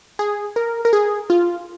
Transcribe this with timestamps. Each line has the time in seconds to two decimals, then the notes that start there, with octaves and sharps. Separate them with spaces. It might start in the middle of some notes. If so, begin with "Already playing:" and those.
0.19 G#4
0.56 A#4
0.85 A#4
0.93 G#4
1.30 F4